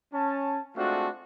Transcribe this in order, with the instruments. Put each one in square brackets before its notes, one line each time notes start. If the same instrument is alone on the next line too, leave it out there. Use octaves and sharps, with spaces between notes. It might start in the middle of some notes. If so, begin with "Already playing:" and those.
[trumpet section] C#4 A5
G#3 A3 C4 D4 F4 F#4